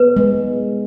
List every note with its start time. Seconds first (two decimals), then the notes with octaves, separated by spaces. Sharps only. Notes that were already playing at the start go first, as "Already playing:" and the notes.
Already playing: B3 B4
0.17 G#3